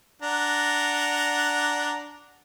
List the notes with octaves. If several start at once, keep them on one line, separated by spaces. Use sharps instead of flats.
D4 F#5 A#5